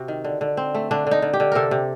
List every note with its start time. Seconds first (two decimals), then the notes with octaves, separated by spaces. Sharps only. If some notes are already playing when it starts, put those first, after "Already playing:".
Already playing: C3 F#4
0.08 D#3
0.24 D3
0.41 D3
0.57 C4
0.75 A3
0.91 D3 D4
1.07 D3 D#4
1.22 D3
1.33 G4
1.40 D3
1.52 C3 A4 A#4
1.71 C3